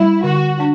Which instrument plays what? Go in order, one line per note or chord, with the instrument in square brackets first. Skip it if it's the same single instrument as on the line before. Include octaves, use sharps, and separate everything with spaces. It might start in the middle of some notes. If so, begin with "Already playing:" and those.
Already playing: [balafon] G3 [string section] E4
[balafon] D3 [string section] F#4
[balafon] D4